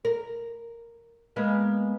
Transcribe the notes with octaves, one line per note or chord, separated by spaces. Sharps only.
A#4
G#3 A#3 B3